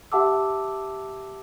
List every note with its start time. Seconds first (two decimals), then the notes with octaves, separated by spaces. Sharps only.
0.12 G4 E5 F#5 A5 D6 E6